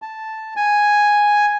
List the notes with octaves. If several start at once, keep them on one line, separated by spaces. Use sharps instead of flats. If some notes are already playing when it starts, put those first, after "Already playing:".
A5
G#5